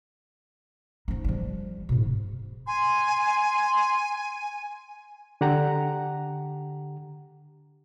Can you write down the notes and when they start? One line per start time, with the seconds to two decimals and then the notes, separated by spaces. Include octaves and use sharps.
1.08 F3 D#4
1.25 F3 G3
1.89 G#2 B2
2.67 G#5 C6
5.41 D3 G4 F#5 A#5